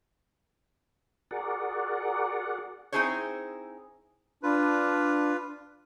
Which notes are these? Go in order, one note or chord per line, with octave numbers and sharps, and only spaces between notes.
F#4 G#4 A#4 D5 F#5
C4 D#4 E4 G#4 C5 C#5
D4 F4 B4